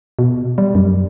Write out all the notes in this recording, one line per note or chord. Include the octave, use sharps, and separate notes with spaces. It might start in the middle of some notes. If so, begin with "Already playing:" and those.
B2
G3
F#2